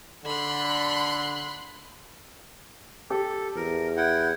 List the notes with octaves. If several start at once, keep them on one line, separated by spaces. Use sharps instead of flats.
D3 B5 C6 F#6
G4 A4
E2 A#4
E4 F#5 G5